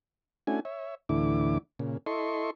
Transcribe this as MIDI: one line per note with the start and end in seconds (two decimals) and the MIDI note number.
0.47 0.60 57
0.47 0.60 61
0.47 0.60 62
0.47 0.60 64
0.47 0.60 66
0.47 0.60 80
0.65 0.95 73
0.65 0.95 76
1.09 1.58 38
1.09 1.58 45
1.09 1.58 50
1.09 1.58 52
1.09 1.58 64
1.09 1.58 86
1.79 1.97 46
1.79 1.97 49
2.06 2.50 64
2.06 2.50 69
2.06 2.50 75
2.06 2.50 84
2.06 2.50 85